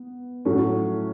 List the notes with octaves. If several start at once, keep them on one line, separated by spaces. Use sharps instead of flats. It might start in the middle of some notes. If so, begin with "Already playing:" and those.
Already playing: B3
A2 F#3 A3 C#4